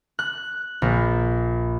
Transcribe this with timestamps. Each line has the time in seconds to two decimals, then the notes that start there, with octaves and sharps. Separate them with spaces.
0.19 F#6
0.82 A#1